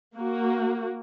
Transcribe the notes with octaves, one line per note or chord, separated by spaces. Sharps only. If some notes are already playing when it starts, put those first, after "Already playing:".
A#3 F#4